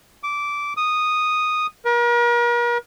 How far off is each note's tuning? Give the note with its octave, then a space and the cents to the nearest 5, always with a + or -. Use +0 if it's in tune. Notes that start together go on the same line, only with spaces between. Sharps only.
D6 -10
D#6 -5
A#4 +40